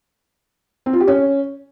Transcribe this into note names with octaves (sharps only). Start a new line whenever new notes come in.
C4
F4
G4
C#4